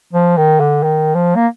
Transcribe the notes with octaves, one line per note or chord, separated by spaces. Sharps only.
F3
D#3
D3
D#3
F3
A#3